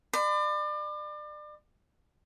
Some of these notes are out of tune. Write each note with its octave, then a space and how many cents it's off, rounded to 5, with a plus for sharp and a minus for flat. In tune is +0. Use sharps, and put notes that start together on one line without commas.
D5 +35 B5 +40